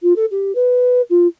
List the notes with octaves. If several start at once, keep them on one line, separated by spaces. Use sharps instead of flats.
F4
A4
G4
B4
F4